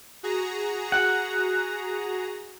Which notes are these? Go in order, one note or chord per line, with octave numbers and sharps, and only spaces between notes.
F#4 G#4 A#5
F#5